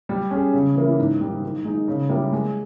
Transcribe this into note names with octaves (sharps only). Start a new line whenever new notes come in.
G3
C#4 G#4
C#3
E3 A#3 E4
G#2
D#3 G3
D#3
G#3 D#4
C#3
G3 A#3 E4 A#4
G#3